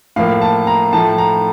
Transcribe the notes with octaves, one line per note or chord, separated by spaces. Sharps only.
A2 F3 A#3 F5
A5
A#5
A2 F3 A3 A5
A#5